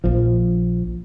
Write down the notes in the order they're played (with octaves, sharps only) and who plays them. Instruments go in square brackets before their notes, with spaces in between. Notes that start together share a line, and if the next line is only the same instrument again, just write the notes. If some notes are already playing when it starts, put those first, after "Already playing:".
[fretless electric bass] A#1 F3